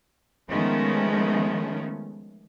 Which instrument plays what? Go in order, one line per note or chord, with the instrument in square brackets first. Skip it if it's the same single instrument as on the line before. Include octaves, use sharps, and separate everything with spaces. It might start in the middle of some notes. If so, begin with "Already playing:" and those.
[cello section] D#3 F3 G#3 A3 B3 C#4